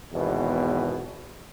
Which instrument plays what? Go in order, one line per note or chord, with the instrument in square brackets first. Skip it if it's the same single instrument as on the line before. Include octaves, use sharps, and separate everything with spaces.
[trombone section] G#1 E2 B2